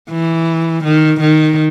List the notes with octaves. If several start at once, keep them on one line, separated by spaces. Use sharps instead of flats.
E3
D#3
D#3